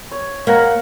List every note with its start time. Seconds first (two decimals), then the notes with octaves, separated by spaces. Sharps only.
0.11 C#5
0.47 A#3 F5 F#5 A#5